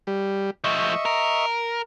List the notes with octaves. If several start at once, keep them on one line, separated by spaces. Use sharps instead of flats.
G3
F3 A3 D#5 E5 C#6
A#4